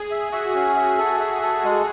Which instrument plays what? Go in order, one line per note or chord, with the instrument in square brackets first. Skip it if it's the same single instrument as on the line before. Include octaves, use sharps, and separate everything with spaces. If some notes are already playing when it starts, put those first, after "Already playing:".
Already playing: [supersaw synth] G#4
[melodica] E5
[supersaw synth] F#4 [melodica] E5
[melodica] C#4
E5
A4
E5
A4
G#3